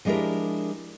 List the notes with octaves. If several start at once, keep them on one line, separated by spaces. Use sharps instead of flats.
F3 G#3 D4 E4 G4 A#4